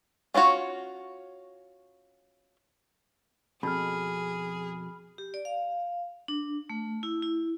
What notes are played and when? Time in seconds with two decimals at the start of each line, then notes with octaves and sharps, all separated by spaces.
0.34 C#4 D4 F4 F#4 C#5
3.63 F2 B2 G#4 B5 F6
5.18 G4
5.34 D5
5.45 F5
6.28 D4
6.70 A3
7.03 E4
7.22 E4